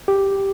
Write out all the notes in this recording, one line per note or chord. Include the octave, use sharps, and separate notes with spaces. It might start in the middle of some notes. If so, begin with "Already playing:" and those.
G4